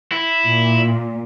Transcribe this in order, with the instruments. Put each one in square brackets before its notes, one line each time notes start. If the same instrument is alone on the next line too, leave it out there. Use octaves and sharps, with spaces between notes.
[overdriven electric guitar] E4
[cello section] A#2